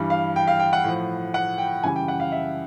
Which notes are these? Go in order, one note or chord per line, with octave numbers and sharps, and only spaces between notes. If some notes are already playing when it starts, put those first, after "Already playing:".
Already playing: G2 E3 G3
F5
G5
F5
G5
F#5
A2 F3
F#5
G5
F#2 C#3 E3 G3 G#5
G5
F#5
F5
E5